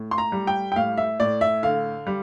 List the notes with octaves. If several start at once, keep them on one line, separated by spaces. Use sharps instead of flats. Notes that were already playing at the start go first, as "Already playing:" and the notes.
Already playing: A2
C6
A#5
G3
G5
G5
A2 F5
E5
A2 D5
E5
D3 F5
G3